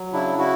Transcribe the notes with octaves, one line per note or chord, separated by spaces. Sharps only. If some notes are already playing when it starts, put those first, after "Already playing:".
Already playing: F#3
C#3 D4 E4
E4 F#4